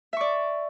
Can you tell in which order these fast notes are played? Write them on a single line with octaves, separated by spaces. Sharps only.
E5 C#6 D5